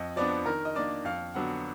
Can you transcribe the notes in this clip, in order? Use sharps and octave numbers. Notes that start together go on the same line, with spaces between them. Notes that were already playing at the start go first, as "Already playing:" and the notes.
Already playing: F2 D#5
F3 B3 D4 D5
D#3 A#4
D#5
A#3 D4 D5
F2 F5
D3 F#3 B3 D4 F#5